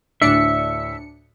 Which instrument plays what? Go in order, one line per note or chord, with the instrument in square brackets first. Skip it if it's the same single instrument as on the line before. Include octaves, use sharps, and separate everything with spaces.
[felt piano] D2 A2 B6 [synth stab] D4 C#7 [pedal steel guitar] E5